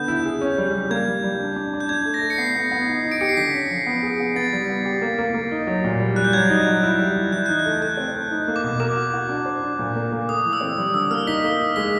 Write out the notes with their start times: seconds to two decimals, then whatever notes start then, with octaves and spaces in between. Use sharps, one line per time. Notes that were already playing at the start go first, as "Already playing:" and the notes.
Already playing: D3 B3 G6
0.08 E4
0.25 G#4
0.41 C#4
0.58 G3
0.74 G3
0.90 A#3 G#6
1.07 G3
1.24 G3
1.39 D4
1.56 D4
1.73 D4
1.80 G6
1.89 D4 G#6
2.05 A3
2.14 A#6
2.22 A3
2.30 C#7
2.38 B3 C7
2.55 B3
2.71 B3
2.87 D#4
3.04 D#4
3.12 D7
3.21 G4 C#7
3.29 C7
3.37 D3 B6
3.53 C#4
3.70 F3
3.86 B3
4.03 G#4
4.20 B3
4.35 B3 A6
4.53 G3
4.69 B3
4.85 G4
5.02 A#3
5.19 A#3
5.34 A#3
5.51 D#4
5.67 F#3
5.84 A#2
6.00 G3
6.16 G3 F#6
6.24 G6
6.33 F#3 G#6
6.50 D#4
6.67 F#3
6.83 E4
6.99 G3
7.16 E4
7.32 E3 G6
7.46 D#4 F#6
7.59 G6
7.65 A3
7.81 A3 F#6
7.97 C4
8.14 A3
8.31 D#4
8.48 A#3
8.56 D6
8.64 B2
8.80 A#4 D6
8.97 F#4
9.14 F#4
9.29 D4
9.46 C5
9.62 D4
9.79 A#2
9.96 A#3
10.12 A#3
10.29 A3 D#6
10.45 E3
10.53 E6
10.61 C4
10.78 G3
10.94 D3 E6
11.11 A#3 F6
11.27 D#4 B6
11.44 A#3
11.60 D#4
11.76 G#3 B6